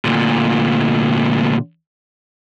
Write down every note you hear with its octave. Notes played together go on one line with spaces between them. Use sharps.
D2 A#2